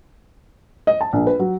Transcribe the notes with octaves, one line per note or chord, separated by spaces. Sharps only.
D#5
A5
A#1
B4
F#3